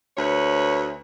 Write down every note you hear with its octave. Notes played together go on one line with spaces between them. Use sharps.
D2 B4 C#5